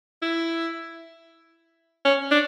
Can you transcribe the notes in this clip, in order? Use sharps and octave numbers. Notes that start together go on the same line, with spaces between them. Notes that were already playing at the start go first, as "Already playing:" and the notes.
E4
C#4
D4